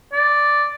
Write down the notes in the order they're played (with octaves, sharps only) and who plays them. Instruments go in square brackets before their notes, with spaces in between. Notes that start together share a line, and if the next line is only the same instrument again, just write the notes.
[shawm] D5